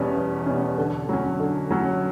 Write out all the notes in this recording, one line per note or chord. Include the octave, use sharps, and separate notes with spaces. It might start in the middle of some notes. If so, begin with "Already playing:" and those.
Already playing: E2 B2 G3 C#4
E2
B2 G3 C#4
D3
F#3 C#4
D3
F#3 C#4